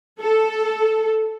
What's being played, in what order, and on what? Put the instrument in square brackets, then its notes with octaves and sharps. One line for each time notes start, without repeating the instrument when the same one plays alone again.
[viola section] A4